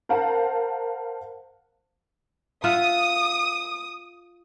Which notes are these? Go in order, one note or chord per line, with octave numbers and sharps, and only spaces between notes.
A#4 C5 F5 F#5 A5 A#5
F4 E5 F#5 D#6